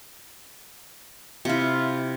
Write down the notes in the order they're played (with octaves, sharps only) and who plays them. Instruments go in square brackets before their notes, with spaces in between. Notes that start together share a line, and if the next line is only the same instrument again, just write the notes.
[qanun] C3 E4 [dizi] F4